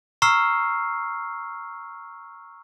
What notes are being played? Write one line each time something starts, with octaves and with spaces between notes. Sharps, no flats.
A#5 C#6 E6 F6 C7